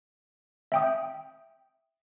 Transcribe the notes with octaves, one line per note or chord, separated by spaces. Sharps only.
E5 G5 D#6